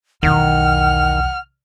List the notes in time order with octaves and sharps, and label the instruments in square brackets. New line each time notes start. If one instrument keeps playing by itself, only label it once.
[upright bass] B1 E2 [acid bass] D#3 [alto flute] F#5 [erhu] F6